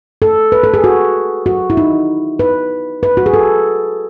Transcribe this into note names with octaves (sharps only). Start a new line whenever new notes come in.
A4
B4
A4
G#4
F#4
F#4
E4
D#4
B4
B4
F#4
G#4
A4